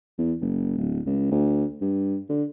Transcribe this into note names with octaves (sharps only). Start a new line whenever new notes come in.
E2
F#1
D1
C#2
D2
G2
D3